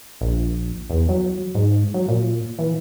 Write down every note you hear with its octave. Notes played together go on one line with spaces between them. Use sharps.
A#1
E2
F#3
G#2
F#3
A#2
E3